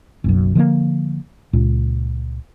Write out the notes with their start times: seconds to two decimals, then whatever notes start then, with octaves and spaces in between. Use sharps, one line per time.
0.24 F#1 B1 F#2
0.55 D3 F3 G#3 A#3
1.53 C#2 A#2